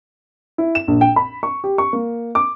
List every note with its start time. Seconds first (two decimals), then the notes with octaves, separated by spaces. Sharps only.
0.58 E4
0.75 E7
0.88 A#1
1.01 G5
1.16 B5
1.43 C#6
1.64 G4
1.78 C#6
1.93 A#3
2.35 D6